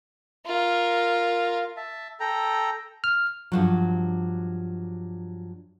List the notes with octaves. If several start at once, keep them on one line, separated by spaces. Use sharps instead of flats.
F4 A#4
E5 A5
A4 G5 A#5
F6
G2 F3 F#3